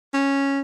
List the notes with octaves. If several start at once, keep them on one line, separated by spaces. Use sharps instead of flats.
C#4